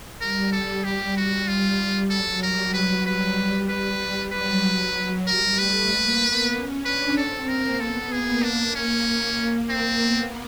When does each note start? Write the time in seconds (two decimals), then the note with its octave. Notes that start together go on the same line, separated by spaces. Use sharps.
0.21 G3 A#4
0.52 A4
0.84 G4
1.16 G3 F#4
1.48 F4
2.10 F#3 A4
2.43 G3 A#4
2.74 F#3 B4
3.06 G3 B4
3.69 B4
4.01 G3
4.32 F#3 B4
4.64 F#3
5.27 G3 A#4
5.58 A3 B4
5.91 A#3
6.22 B3
6.54 C#4
6.85 D4 B4
7.17 C4 A4
7.48 A#3 A#4
7.80 B3 A4
8.12 A#3 G#4
8.43 D4
8.75 A#3 C#4
9.06 A#3
9.70 C4
10.02 B3